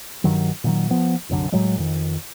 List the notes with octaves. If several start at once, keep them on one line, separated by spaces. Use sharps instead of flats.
G2 D#3 F#3
A#2 D#3 F#3
F3 B3
F1 C2 F#2 D3
A2 F#3 G#3
F2 D#3